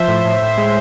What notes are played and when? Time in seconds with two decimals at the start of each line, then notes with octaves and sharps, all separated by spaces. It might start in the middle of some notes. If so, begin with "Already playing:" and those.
Already playing: F3 C5 E5
0.08 A2
0.25 A2
0.42 A2
0.57 G#3